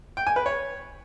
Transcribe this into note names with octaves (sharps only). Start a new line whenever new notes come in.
G5
G#5
B4
C#5